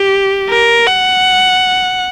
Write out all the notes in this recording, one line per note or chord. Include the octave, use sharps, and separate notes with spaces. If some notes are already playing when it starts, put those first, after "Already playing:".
Already playing: G4
A#4
F#5